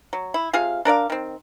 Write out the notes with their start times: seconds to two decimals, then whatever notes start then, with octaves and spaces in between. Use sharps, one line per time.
0.13 F#3
0.34 E4
0.53 C3 F4 G#4 F5
0.85 D4 A#4 D5 F5
1.10 D#3 C4